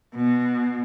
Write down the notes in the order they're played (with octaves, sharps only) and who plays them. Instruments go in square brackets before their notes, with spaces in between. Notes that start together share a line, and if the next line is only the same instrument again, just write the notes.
[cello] B2